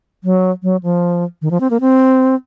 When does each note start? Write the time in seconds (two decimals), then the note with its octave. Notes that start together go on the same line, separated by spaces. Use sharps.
0.24 F#3
0.63 F#3
0.83 F3
1.42 D#3
1.51 F3
1.61 C4
1.71 A#3
1.81 C4